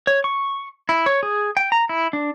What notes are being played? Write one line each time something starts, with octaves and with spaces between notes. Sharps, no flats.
C#5
C#6
E4
C#5
G#4
G5
A#5
E4
D4